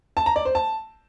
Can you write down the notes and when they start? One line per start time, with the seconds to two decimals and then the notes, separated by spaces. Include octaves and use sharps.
0.17 A5
0.26 A#5
0.36 D5
0.45 C5
0.55 A5